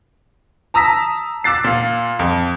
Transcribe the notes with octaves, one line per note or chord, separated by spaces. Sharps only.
A5 A#5 D#6 E6 A#6 B6
D6 E6 F#6 A6 C7
A#2 F5
F2